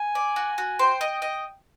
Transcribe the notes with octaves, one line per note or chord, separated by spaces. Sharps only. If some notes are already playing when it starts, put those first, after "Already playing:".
Already playing: G#5
D5
F#4
F#4
C5 G5
D#5
D#5